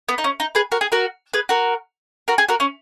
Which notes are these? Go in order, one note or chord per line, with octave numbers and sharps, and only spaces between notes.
B3
D#4
C#4
D#4
G#4 B4
F#4 A#4
G#4
F#4 A#4
G#4 B4
F#4 A#4
F#4 A#4
G#4
F#4 A#4
C#4